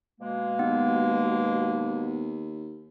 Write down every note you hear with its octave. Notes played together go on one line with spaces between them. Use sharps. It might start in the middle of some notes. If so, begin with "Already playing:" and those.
B2 G#3 A#3
D#2 B3